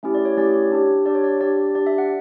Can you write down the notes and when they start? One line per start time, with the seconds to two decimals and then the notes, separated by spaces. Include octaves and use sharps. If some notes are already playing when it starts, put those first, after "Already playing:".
0.03 A3 C#4 E4 G4
0.15 D5
0.25 C#5
0.37 A3 C#4 E4 G4 D5
0.54 C#5
0.72 D4 G4
1.06 D4 G4 D5
1.15 C#5
1.24 D5
1.41 D4 G4 D5
1.75 D4 G4 D5
1.87 E5
1.98 F#5